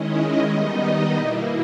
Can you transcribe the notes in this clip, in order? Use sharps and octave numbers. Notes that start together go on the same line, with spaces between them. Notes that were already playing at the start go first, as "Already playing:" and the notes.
Already playing: D#3 G#3 C#4 E4 D#5
D#5
D#3 G3 B3 D#4 D#5
D#5
B2 A#3 E4